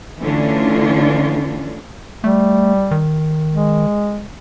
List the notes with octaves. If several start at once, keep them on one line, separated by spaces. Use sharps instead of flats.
D3 E3 A3 C#4 D4 F4
G3 A3
D#3
G#3